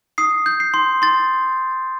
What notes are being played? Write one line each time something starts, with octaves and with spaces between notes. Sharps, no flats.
D#6 C7
G6
C7
C6
C6 A6